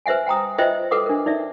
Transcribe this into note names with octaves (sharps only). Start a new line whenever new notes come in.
B4 C5 E5 F#5 G#5
F#5 G5 A#5 D#6
F4 B4 C5 D#5 E5 G5
A4 B4 F#5 D6 D#6
D4 A#4
D#4 D5 E5